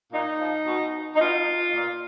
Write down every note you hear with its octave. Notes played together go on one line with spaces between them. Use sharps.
A#2 D#4
F3
B2
D#4
B2 F4
A#2